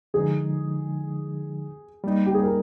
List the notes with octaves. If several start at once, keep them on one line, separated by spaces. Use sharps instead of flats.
D3 F3 G#3 D#4 G#4
G3 A#3 D#4
G4
G#4
A#4